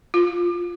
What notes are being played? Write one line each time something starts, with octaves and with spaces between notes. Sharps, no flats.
F4